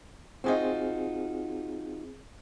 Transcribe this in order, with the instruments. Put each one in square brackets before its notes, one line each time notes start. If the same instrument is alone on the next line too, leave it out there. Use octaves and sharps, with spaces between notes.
[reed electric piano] C4 G#4 [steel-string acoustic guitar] D#4 F4 F#4